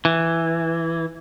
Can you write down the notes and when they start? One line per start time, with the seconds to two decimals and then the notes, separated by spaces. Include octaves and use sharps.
0.05 E3